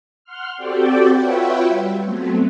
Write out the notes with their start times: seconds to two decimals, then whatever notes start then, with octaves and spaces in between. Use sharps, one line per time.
0.25 F#5 C6 F6
0.57 C4 F#4 G4 A4 D5 G5
1.13 F4 F#4 B4 C#5 E5 G5
1.67 G3
2.02 F#3 A3 B3 C4